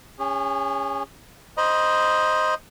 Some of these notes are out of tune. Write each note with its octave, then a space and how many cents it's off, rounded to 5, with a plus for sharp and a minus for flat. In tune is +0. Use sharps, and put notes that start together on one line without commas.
C#4 +0 G#4 -40
C5 +0 D#5 +0 B5 -45